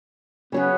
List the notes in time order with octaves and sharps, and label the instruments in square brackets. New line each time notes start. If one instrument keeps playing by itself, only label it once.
[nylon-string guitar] C#3 F#3 C#4 G#4 [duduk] B3